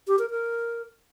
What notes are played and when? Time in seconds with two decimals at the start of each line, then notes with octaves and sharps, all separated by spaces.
0.07 G4
0.19 A#4
0.30 A#4